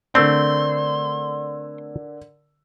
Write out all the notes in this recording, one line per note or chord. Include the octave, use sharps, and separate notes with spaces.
D3 A3 C4 A#4 D5 C6 E6